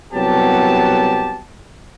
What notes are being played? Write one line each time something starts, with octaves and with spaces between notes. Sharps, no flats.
C2 F#3 B3 G4 A5